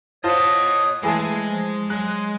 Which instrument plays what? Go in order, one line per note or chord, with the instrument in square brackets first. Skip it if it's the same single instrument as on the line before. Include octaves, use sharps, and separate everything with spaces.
[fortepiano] F4 C5 A5 [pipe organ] C#5 D#6 [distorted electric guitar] D#5 F#5
[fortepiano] E3 G#4 A5 [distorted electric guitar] G#3 [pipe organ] A3
[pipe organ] F3
[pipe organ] F#3 [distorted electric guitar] G#3 [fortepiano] F#6